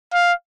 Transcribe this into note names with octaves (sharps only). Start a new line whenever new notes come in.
F5